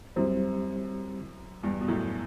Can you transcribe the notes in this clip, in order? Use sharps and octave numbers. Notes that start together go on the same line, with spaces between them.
F#2 G3 C4 E4 G4 C5
E2 G2
B2
F#2 A2